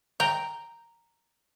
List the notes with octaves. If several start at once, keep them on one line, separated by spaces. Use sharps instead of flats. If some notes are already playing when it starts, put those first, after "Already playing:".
G5 A#5